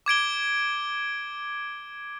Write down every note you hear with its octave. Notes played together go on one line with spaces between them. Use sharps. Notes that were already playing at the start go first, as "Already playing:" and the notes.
D6 G#6 D7 G7